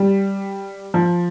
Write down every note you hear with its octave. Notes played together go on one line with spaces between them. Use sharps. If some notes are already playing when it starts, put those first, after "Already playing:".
Already playing: G3
F3